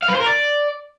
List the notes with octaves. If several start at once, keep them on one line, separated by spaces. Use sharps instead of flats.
F5
B4
C5
A#4
D5